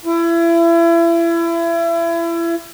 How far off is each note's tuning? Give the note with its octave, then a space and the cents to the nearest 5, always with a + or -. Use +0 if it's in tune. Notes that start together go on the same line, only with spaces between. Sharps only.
E4 +30